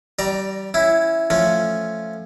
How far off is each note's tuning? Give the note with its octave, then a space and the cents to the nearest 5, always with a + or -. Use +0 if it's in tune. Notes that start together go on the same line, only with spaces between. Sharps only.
G3 -25 D5 +10 A#5 +0
C#4 +0 E4 +0
F3 +0 A3 +0 C#4 +0